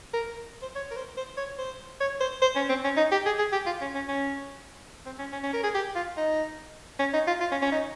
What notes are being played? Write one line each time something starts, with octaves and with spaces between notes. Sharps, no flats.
A#4
C5
C#5
A#4
C5
C5
C#5
C5
C#5
C5
C5
C#4
C4
C#4
D#4
G4
G#4
G#4
G4
F4
C#4
C#4
C#4
C4
C#4
C#4
C#4
A#4
G#4
G4
F4
D#4
C#4
D#4
F4
F4
C#4
C#4
D#4